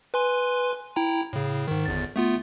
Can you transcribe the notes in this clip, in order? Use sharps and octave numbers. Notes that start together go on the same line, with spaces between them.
B4 G#5 C6
E4 G5 A#5
A2 C#3
G#2 D#3
G1 E2 A6
A3 B3 F4